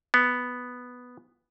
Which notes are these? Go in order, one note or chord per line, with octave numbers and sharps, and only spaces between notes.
B3